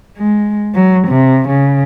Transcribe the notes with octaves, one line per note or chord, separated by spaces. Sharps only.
G#3
F#3
C3
C#3